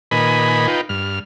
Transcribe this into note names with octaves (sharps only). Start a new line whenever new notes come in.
A#2 D#3 B4 D#5 G#5 B5
D#4 F4 B4 G5
G2 F6